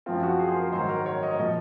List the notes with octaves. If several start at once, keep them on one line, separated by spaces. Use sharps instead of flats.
F#2 F3 C4 F4
F#4
G#4
C5
A#4
G#2 D#3 F#3 C5
A#4
C#5
D#5
C#5
A#2 F3 A#3 D#5